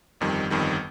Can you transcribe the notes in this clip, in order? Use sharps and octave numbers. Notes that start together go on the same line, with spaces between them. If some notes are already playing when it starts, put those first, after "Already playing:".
G1 F2 D#3 G3
G1 F2 D#3 G3